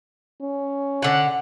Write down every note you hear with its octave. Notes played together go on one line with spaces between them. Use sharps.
C#4
D3 F#5